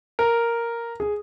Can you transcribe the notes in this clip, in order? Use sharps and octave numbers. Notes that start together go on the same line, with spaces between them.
A#4
G#4